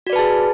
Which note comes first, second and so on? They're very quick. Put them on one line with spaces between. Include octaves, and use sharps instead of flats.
F#4 D5 B4 A5 G#4